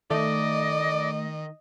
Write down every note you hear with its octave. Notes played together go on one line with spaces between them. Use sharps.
D#3 A3 D5 D#5